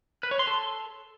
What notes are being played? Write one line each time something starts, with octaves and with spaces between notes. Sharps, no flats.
B4
C#5
C6
A4